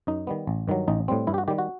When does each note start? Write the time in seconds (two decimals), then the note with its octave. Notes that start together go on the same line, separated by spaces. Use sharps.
0.07 F#2 D#4
0.27 D#3 G3 B3
0.47 A1
0.68 G2 D#3 F#3
0.88 A1 D#4
1.08 A2 G3 C4
1.27 G2 E4
1.34 G4
1.38 F#4
1.48 D#3 G3 G4
1.58 F#4